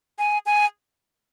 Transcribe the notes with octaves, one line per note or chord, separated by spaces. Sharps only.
G#5
G#5